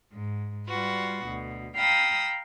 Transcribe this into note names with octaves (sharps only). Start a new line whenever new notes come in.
G#2
G3 F4 F#4 B4
D2 B2
F5 G5 A#5 B5 D#6 E6